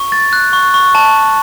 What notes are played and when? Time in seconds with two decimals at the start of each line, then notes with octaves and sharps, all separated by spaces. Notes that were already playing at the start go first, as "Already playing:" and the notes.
Already playing: C#6
0.12 A6
0.33 F#6
0.53 C#6
0.74 C#6
0.95 A5